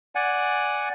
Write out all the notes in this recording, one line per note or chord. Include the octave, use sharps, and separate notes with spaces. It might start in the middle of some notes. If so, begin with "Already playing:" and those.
D5 F#5 G#5